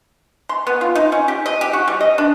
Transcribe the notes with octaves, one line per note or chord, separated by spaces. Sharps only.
C6
B3
F4
D#4
C#4
G4
D#5
G4
F#4
G3
D#5
D4